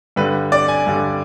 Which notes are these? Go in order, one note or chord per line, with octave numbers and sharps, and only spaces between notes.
G2 D3 G3 B4
D5
G#5
G2 D3 G3